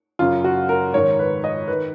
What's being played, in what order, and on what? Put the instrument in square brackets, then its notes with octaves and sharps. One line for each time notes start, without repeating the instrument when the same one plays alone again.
[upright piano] F#2 C#3 F4
F#4
A#4
G#2 D#3 C#5
B4
D#5
D#3 B4